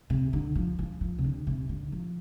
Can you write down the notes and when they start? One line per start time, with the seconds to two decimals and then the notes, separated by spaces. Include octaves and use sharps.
0.10 C3
0.33 D3
0.55 F3
0.79 F3
1.01 F3
1.19 C3
1.24 D3
1.47 C3
1.69 D3
1.92 F3